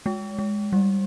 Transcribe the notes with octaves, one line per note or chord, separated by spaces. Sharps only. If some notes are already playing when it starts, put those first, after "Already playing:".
G#3
G#3
G3